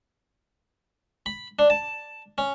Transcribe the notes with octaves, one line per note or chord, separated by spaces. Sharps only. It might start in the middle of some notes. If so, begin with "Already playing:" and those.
B5
D4
A5
C#4